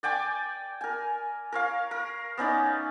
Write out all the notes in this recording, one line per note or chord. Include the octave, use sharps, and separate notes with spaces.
D5 G5 G#5 D6
A#4 G#5
A#4 C#5 F5
A#4
B3 C#4 D#4 D5